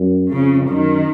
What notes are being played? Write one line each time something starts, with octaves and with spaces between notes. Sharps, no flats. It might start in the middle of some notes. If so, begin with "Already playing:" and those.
Already playing: F#2
F2 C#3
F#2 D#3